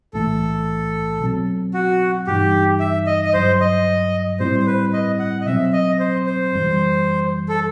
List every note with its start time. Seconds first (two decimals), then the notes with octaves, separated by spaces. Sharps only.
0.13 B1 A2 E3 A3 A4
1.20 B2 F#3 C4
1.74 F#4
2.27 G2 E3 G3 D#4 G4
2.80 E5
3.07 D#5
3.25 D#5
3.34 G1 G2 F#3 C5
3.60 D#5
4.40 A2 G3 C4 E4 C5
4.59 C5
4.67 B4
4.93 D#5
5.19 F#5
5.41 D#5
5.46 B2 F#3 C4 E5
5.73 D#5
5.99 C5
6.26 C5
6.53 G1 F#2 E3 G3
7.49 A4